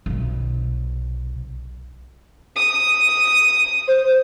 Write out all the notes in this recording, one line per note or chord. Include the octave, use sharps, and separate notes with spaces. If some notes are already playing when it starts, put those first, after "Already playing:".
B1 C3
D#6
C5